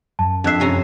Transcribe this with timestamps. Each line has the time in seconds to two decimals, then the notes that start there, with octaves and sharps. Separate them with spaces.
0.19 F#2 A5
0.44 F2 D4 E5 F#6 C7
0.60 C3 C#4 A#5